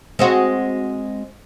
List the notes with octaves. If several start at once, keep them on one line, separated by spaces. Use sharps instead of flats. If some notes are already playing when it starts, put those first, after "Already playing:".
G#3 C4 F#4